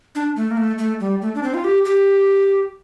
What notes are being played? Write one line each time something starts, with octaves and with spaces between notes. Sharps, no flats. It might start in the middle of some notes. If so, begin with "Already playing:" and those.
D4
A3
A#3
A3
A3
G3
A3
D4
C4
F4
G4
G4